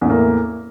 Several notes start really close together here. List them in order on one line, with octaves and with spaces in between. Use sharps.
E2 A2 A#3